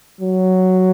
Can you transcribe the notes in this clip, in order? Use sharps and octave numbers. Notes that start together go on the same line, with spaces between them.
F#3